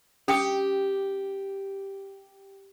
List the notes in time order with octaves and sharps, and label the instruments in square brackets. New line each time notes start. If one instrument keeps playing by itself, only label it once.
[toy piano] C#4 G5 D#6 [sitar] G4